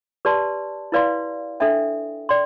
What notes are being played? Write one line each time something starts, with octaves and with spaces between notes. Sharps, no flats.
G4 B4 D5 A5 C6
E4 B4 D5 F5 C6
D4 A4 E5 G5
D5 G5 C6